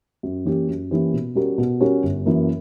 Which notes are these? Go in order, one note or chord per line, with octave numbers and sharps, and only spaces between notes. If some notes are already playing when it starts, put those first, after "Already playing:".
F#2
E3 A#3 C#4 G4
F#2
E3 A#3 C#4 G4
B2
G3 C#4 F#4 A#4
B2
G3 C#4 F#4 A#4
G1
F#2 E3 A#3